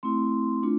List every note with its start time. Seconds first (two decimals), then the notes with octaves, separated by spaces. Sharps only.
0.03 A3 C4 E4 C6
0.63 A3 D4 F4